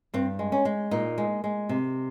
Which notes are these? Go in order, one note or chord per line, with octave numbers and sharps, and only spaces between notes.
G2 C4
G#3
C#4
G#3
A#2 D#4
G#3
G#3
C3